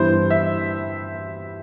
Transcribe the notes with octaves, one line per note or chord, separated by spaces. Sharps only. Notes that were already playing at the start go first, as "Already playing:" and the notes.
Already playing: G2 E3 G3 B3 E4 C5
E5